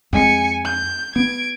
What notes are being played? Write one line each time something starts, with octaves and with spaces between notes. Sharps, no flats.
F2 G#3 G#5 C#7
G6
B3 G#6 D7